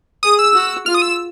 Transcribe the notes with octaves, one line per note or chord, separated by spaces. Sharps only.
G#4 D#6
E6
F#4
F4 F6
D#6
E6